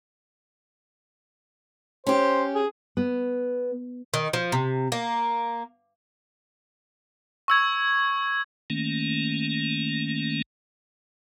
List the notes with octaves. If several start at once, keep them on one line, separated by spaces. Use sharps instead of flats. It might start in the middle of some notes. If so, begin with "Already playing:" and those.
C#4 G4 C5
G#4
B3
D#3
F3
C3
A#3
C#6 E6 G#6
D#3 A3 A#3 C#4